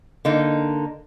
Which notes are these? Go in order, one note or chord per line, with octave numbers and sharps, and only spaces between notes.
D3 A#3 D#4